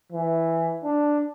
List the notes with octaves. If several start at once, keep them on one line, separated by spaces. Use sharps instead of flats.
E3
D4